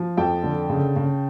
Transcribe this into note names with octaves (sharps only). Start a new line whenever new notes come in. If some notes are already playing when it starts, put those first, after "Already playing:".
Already playing: F3
F2 G5 A5
D3
C#3
C#3